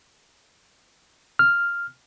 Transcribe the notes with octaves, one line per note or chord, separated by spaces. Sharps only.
F6